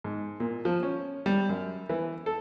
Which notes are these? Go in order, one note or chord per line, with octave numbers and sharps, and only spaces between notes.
G#2
A#2
F3
C#4
G3
F#2
E3
A4